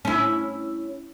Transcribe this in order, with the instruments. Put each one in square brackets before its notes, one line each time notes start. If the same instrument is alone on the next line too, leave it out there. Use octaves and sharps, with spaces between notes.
[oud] C#4 E4